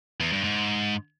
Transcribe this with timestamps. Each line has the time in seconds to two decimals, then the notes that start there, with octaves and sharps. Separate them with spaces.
0.20 E2
0.32 G2
0.44 G#2